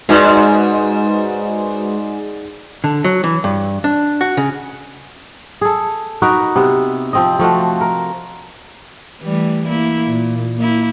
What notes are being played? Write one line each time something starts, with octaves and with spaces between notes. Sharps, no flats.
G#2 G#3 D#4 F#4 B4 D5
D3
F#3
E3
G2
D4
F#4
C#3
G#4 A4
D#4 F#4 A#4 B4
C3 B3
F3 C4 D#5
F3 A3 F4 F#4
A#4
E3 G3 A3
A#3 E4
A#2
A#3 E4